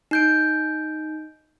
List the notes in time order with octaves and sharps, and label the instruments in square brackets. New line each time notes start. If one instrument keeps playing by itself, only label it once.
[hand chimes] D#4 G6 D7